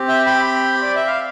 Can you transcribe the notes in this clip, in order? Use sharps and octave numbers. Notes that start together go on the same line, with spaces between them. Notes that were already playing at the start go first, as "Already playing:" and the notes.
Already playing: C4 G4
E5 G5
G5 B5
D5
E5
F5